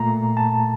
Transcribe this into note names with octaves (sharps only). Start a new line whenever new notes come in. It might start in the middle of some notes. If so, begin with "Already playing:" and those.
Already playing: A#2 A3 A#5
A5